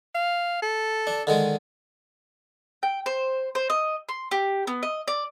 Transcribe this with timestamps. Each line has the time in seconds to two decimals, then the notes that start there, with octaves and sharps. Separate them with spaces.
0.14 F5
0.62 A4
1.07 D4
1.27 D3 D#3 G#3
2.83 G5
3.06 C5
3.55 C5
3.70 D#5
4.09 C6
4.31 G4
4.67 B3
4.83 D#5
5.08 D5